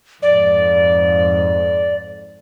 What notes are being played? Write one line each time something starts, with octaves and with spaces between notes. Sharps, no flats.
F2 G#2 D5